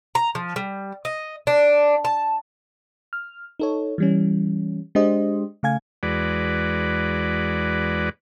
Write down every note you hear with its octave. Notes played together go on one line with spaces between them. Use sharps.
A#5
F3
G3
D#5
D4
A5
F6
D#4 A4 C#5
E3 G3 C#4
G#3 D4 G4 C5 D#5
C#3 A3 F5 G#5 G#6
E2 G#3 F#4 B4 D5